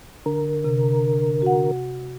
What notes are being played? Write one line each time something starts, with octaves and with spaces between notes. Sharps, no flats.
D3 A#4
C3
F#4 F#5